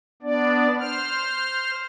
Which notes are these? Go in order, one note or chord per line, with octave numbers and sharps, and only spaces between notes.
B3 D4 D5
C5 F6